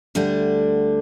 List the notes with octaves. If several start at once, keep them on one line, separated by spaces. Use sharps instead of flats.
D2 D3 G3 D4